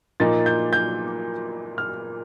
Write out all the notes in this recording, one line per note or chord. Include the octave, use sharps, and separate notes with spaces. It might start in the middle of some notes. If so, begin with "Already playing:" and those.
A#2 F3 A#3 D#4 A6
G6
G6
F6